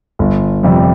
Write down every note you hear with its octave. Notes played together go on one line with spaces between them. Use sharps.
G1
F2 C3 G3